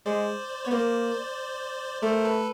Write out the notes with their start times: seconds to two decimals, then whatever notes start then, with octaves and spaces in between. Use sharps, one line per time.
0.06 G#3 C5 D5
0.65 B3 C#5
0.71 A#3 C5 D5
2.02 A3 A#4 C5
2.25 A4 B4